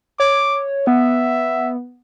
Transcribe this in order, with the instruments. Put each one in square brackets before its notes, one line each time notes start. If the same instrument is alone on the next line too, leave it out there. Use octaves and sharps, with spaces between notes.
[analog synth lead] C#5 [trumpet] D6
[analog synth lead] B3 [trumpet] E5